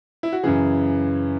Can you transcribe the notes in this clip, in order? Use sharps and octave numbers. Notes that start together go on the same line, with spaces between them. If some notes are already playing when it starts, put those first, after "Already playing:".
E4
F#4
F#2 C#3 E3 G#4